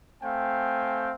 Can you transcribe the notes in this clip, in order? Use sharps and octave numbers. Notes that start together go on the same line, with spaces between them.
A3 C4 F5 G5 G#5